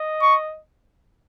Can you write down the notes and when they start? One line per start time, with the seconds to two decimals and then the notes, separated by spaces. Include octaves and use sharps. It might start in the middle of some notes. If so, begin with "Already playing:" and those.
Already playing: D#5
0.22 C#6